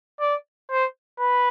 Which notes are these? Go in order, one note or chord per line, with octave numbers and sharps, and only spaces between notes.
D5
C5
B4